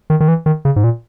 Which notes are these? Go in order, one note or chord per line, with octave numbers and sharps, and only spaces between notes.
D#3
D#3
E3
D#3
C#3
G#2
A#2